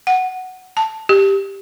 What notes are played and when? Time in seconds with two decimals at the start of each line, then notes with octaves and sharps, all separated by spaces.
0.07 F#5
0.77 A5
1.09 G4